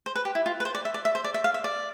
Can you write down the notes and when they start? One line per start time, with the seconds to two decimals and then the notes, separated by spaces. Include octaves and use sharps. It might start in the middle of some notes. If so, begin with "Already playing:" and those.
0.06 C5
0.16 B4
0.25 G4
0.35 E4
0.46 F4
0.60 B4
0.65 C5
0.75 D5
0.85 E5
0.94 D5
1.05 E5
1.15 C5
1.24 D5
1.34 E5
1.44 F5
1.54 E5
1.64 D5